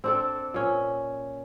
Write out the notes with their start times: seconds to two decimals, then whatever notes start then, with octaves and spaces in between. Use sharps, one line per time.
0.04 C4 D4 A4
0.54 A#2 C#4